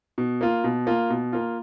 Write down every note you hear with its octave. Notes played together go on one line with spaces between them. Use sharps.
B2
A#3 F4
B2
A#3 F4
B2
A#3 F4